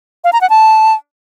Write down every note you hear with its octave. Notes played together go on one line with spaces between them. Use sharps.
F5
A#5
F#5
A5